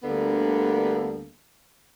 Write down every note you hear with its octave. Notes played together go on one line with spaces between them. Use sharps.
D2 D3 G3 A#3 B3